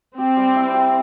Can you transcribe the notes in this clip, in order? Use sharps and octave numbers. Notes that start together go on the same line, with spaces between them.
C4 G4
G3
E4
G4